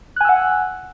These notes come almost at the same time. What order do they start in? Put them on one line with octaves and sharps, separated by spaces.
F#6 G#5 E6 F#5